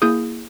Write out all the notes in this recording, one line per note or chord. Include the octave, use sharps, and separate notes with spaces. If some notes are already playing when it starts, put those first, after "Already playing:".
A#3 E4 G#4 D#6 G6